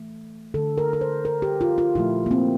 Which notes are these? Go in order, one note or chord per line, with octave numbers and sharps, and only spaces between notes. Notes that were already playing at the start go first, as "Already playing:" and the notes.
Already playing: E3 A3
D3 A3 A4
A#4
A#4
C5
A#4
G4
F4
F4
A#2 F3 A3 E4
A#3
C4